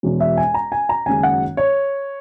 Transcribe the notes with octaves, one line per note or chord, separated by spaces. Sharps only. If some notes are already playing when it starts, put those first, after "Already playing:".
E1 E2 B2
E5
G#5
A#5
G#5
A#5
F#1 F#2 D#3 G#3 G#5
F#5
C#5